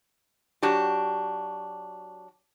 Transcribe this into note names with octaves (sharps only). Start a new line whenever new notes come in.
F#3 D4 F#4 G4